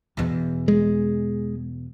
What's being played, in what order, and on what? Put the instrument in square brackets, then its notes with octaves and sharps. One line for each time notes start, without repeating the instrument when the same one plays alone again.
[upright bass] E2 B2
[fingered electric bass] G#3